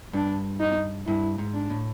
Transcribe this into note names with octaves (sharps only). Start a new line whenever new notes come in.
G2 D4
D#4
G2 E4
G#2
D4
A2